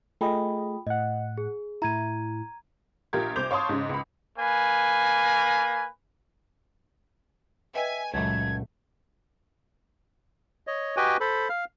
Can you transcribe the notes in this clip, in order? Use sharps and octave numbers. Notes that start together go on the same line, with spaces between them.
A3 F4 G#4 D#5 G5 B5
A2 D#5 F#5
G#4
A2 E4 A#5 G#6 D#7
A#1 F4 G4 A#4 G#6
C2 C5 D6 G6 F7
C#5 F5 A5 C6 D#6
G#2 C#3
C#2 B5
A#3 B4 G#5
B4 D#5 E5 G5 G#5
C#2 F#2 A#2 F#3 G#3 A3 G#6
C#5 D#5
F#4 G4 B4 D#5 G5 G#5
A4 C5 B5
F5 F6